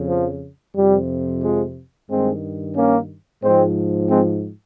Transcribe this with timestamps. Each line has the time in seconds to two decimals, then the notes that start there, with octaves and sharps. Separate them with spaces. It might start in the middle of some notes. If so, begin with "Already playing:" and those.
Already playing: F2 C#3
0.08 F3
0.75 F2 C3 F3 G3
1.43 F3 G#3
2.10 G2 D#3 G#3 C4
2.76 A#3 C#4
3.43 G#2 F3 G#3 C4
4.10 G#3 C4